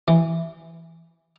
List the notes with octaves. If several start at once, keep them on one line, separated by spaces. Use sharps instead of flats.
E3